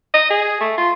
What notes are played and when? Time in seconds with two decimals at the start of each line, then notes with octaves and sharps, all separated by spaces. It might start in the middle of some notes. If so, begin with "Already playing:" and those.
0.14 D#5
0.30 G#4
0.61 A3
0.78 F4